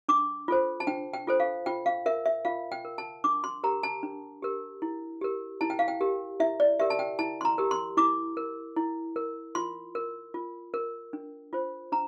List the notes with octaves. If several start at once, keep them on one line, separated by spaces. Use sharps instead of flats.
D4 D6
F4 A4 C5
A5
D4 G5
G5
F4 A4 C5
F5
F4 G5
F5
A#4 E5
E5
F4 F5
G5
A#4
A5
D4 D6
C6
G4 A#4 A#5
A5
D4
G4 A#4
E4
G4 A#4
E4 A5
G5
F5
G5
G4 A#4
E4 E5
D5
G4 A#4 E5
A5
G5
E4 A5
C6
A#5
G4 A#4
C6
E4 D6
A#4
E4
A#4
F4 C6
A#4
F4
A#4
D4
F4 C5
D4 A#5